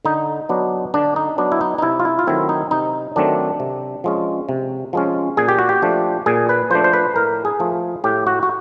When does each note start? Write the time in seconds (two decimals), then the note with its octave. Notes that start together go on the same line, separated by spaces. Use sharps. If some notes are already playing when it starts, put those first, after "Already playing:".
0.05 D3 D#4
0.49 F#3 B3 D4
0.94 D3 D4
1.16 D#4
1.38 F#3 B3 D4
1.52 E4
1.61 D#4
1.78 D#4
1.82 C3 E4
2.00 F4
2.05 E4
2.19 F4
2.27 D#3 F#3 A3 C4 E4
2.49 D#4
2.71 C3 D#4
3.16 D#3 F#3 A3 C4 D4
3.60 C3
4.04 F3 G#3 C#4
4.49 C3
4.93 F3 G#3 C#4
5.37 A#2 G#4
5.48 G4
5.59 F#4
5.69 G4
5.82 F3 A3 D4
6.26 A#2 G#4
6.49 B4
6.71 F3 A3 D4 C5
6.84 C5
6.93 B4
7.16 A2 A#4
7.45 G#4
7.60 F3 A3
8.04 A2 G4
8.27 F#4
8.43 F#4